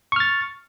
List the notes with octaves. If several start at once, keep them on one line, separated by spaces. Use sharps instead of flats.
C#6 F6 A6